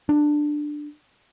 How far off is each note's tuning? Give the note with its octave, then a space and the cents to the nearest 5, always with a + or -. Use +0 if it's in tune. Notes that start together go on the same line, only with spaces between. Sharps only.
D4 +10